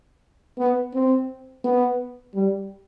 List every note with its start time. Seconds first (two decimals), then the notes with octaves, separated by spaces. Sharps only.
0.59 B3
0.94 C4
1.65 B3
2.35 G3